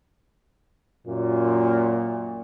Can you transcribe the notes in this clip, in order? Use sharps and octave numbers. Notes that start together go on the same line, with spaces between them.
F#2 A#2